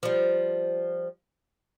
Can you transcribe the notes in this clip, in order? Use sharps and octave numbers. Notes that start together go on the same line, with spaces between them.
F3 G3